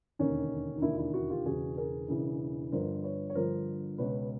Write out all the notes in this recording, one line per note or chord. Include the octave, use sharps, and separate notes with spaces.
E1 D#2 D3 C#4 D#4
D#4
E1 D#2 D3 D4 E4
F4
D4 E4
E4 F#4
F4 G4
E1 E2 C#3 E3 F#4 G#4
G#4 A#4
E1 E2 C#3 E3
G1 G2 D3 F3 A#4 C5
B4 C#5
C#5
G1 G2 D3 F3 A#4 C5
C#2 B2 B4 C#5